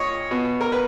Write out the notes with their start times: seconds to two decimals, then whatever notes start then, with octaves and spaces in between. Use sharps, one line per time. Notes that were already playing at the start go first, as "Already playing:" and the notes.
Already playing: A#2 C#5 D#5
0.31 B2
0.61 A#4
0.72 B4